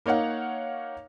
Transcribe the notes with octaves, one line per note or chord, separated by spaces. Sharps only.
A#3 D#4 C#5 F5 F#5